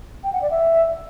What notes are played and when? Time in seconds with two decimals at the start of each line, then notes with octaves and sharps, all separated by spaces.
0.24 G5
0.33 F#5
0.42 D5
0.51 E5